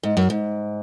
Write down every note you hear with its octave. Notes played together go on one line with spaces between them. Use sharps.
G#2
F#2
G#2